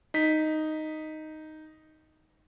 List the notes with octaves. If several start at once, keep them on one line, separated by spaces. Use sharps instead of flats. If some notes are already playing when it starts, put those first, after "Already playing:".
D#4 B6